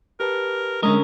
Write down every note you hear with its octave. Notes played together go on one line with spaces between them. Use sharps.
G4 A#4 B4 A5
D3 G#3 C#4 A#4 D#5